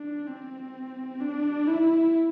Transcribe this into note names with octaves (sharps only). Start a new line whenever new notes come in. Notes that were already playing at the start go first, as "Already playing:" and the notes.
Already playing: D4
C4
D4
E4